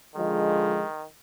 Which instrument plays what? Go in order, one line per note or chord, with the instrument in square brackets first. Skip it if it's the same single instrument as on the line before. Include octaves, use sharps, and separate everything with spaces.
[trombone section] D3 F3 G#3 [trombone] D#3